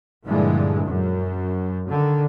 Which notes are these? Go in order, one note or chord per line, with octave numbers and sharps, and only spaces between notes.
G2 A#2 D3 E3 F3 G#3
F#2
D3 D#3